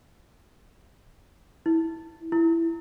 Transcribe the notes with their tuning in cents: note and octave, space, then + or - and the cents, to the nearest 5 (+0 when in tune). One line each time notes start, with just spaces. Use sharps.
E4 -15
E4 +10